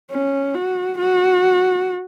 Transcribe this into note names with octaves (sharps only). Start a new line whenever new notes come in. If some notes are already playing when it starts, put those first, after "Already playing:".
C#4
F#4
F#4